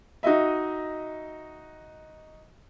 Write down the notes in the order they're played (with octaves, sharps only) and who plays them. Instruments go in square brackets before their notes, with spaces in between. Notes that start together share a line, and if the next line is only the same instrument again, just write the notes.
[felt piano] D#4 F#4 D#5 E5